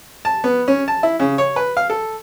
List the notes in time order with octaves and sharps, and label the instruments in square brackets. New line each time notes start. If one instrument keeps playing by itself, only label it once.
[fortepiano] A5
B3
C#4
A5
E4
C#3
C#5
B4
F5
A4